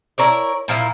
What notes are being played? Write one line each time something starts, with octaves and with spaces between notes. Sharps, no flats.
E4 A#4 C#5 D5
A#2 F3 A#3 E4